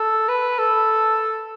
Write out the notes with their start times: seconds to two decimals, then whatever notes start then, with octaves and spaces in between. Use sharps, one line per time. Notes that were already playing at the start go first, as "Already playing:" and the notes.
Already playing: A4
0.28 B4
0.58 A4